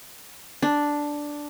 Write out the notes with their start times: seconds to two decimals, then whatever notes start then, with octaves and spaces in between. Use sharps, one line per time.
0.62 D4